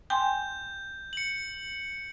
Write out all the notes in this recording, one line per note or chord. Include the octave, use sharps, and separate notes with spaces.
G5 G#5 C6 G6
C#7 F#7